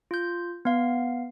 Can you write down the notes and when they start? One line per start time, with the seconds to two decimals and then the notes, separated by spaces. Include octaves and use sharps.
0.11 F4 G6
0.65 B3 F5